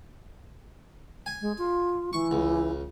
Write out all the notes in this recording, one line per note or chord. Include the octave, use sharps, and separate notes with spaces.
G#5
G#3
F4
E3 C#6
C#2